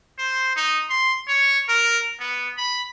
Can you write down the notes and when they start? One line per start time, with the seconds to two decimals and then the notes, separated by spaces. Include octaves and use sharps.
0.18 C5
0.56 D#4
0.90 C6
1.28 C#5
1.68 A#4
2.20 B3
2.58 B5